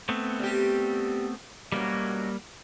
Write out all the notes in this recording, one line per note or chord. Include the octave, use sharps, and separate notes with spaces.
A3 B3 C4
G3 G4
F#2 B2 F#3 G3 A#3